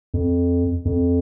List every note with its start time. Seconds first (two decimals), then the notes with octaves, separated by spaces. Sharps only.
0.14 F2
0.85 F2